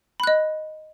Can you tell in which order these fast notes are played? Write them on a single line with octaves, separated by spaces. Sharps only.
B5 F#6 D#5